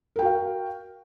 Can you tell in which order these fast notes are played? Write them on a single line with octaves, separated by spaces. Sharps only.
A#4 G5 F#4 F5